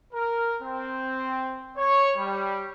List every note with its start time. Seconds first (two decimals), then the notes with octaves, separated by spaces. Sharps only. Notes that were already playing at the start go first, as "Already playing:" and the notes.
0.12 A#4
0.61 C4
1.76 C#5
2.16 G3